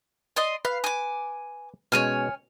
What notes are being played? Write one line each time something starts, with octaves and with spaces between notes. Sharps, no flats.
D5 D#5 C6
B4 F5
G#5 D6
B2 G#3 C#4 C#5 G#5 F6